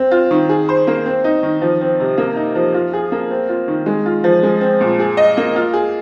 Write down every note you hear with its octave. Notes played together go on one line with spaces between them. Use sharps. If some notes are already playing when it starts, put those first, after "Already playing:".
Already playing: C4
F4
D#3
G#4
C5
A#3
C4
D#4
D#3
F3
C4
C3
A#3
D#4
F3
F4
G#4
A#3
C4
F4
D#3
G#3
F4
F3
G#3
C4
A#2
G#4
D#5
A#3
F4
G#4